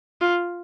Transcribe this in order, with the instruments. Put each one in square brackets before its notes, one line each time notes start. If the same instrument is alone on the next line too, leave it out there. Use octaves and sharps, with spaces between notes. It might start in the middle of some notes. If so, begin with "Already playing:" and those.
[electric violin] F4